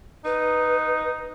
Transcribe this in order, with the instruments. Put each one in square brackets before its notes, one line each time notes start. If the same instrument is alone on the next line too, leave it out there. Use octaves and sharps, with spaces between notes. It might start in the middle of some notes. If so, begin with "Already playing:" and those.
[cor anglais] D#4 [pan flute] B4